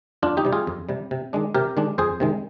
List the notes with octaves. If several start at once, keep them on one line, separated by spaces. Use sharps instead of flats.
F2 D4 F4
D#4 G4
C3 G3
F4 G#4
F2
C3 G3
C3
D#3 G#3 D4
C3 G4 A#4
D#3 G#3 D4
F2 G#4 C5
C3 D#3 G#3